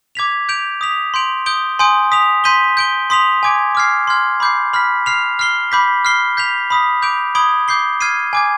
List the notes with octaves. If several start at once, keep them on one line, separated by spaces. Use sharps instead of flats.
D6 G#6 B6 F7
G6 D7 F7
D#6 B6 F7
C6 G6 D7 F7
D#6 G6 D7 G7
G#5 C6 D#6 G6 D7
D#6 B6 F7
C6 G6 B6 D#7 G7
G6 D7 G7
C6 D#6 B6 F7
G#5 D6 G#6 D7
D6 F6 G#6 C7
C6 F6 G#6
B5 D6 G6 C7
B5 F6 B6
F6 C7 F7
F6 C7 G7
B5 D6 G6 B6
F6 C7 G7
G6 B6 F7
B5 D#6 B6
D6 G6 D7 F7
B5 D#6 G#6 D7 G7
D6 G6 C7 G7
F6 G#6 C7 D#7
G#5 D6 G#6